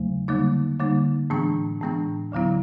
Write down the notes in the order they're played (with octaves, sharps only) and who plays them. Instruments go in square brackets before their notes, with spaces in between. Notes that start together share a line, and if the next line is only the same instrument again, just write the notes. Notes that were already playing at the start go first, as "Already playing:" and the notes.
Already playing: [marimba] E2 C#3 F#3 A3
D3 G3 A#3 D#4
D3 G3 A#3 D#4
A2 E3 G#3 B3 D4
A2 E3 G#3 B3 D4
D2 D3 F#3 B3 E4